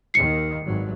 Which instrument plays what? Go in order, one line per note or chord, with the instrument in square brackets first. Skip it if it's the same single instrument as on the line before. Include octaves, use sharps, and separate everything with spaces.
[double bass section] D#2 D#3 [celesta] C7 C#7
[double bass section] G#1 G2 F#3